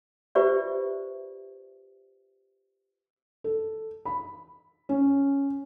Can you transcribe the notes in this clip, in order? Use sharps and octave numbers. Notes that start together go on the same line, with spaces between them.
F4 G4 B4 C5 D5 E5
A4
B5
C#4